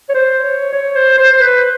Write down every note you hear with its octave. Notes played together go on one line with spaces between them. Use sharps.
C#5
C5
C#5
C#5
C5
C5
C5
B4